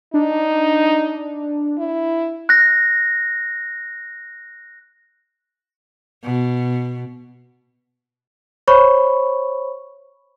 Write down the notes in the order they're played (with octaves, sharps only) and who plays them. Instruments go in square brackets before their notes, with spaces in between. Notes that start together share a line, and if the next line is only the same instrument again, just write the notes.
[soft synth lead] D4 [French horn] D#4
[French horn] E4
[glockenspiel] F#6 A#6
[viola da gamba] B2
[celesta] C5 C#5 B5 C#6